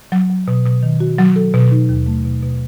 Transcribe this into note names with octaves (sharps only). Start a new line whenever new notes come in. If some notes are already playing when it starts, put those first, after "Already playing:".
F#3
F#3
B2
B2
D#3
F#4
F#3
A4
B2
D#4
D#2
A3
B2
B2